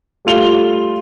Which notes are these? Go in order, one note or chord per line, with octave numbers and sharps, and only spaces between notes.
G3 A3 F4 F7 G7